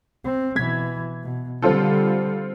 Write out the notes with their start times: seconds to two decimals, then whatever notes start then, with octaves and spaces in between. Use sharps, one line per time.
0.24 C4
0.56 B2 E3 G#6 B6
1.23 B2
1.62 D3 G3 C4 F4 A4